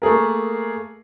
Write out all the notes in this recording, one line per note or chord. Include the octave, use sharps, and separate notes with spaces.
A3 A#3 G#4 A#4